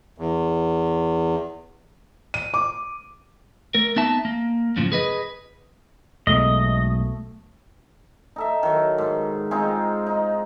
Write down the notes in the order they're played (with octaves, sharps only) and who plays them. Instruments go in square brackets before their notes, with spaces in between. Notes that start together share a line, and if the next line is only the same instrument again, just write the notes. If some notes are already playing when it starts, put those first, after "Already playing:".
[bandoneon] E2
[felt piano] D#7
D6
[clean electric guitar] A3 A#4
B3 C4 D#4 E5 A5
A#3
F#2 A2 C#3 F3
G#4 B4 D#5
[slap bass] B1 G#3 [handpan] B2 A3 [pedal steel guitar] D#5
[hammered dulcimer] D#4 A4 E5
D#3 F#3
G#2
G#3 C4 D#4 F4
D#4